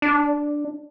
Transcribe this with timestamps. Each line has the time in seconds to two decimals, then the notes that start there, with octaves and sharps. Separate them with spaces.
0.02 D4